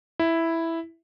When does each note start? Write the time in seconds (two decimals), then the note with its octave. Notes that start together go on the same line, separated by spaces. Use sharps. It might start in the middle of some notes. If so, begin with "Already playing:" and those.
0.19 E4